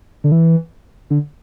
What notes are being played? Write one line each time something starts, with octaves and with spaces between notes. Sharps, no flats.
D3
E3
D3